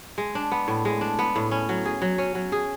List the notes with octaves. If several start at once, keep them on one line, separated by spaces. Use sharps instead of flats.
G#3
D4
B3
A2
G#3
D4
B3
A2
C#4
F#3
G#4
F#3
C#4
F#3
G#4